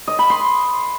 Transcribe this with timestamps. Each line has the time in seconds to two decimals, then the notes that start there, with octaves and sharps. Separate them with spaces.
0.08 D#5
0.19 B5
0.30 C6